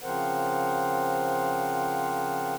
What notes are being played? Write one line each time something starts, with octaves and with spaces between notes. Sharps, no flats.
C#3 F3 C4 A#4 C5 F#5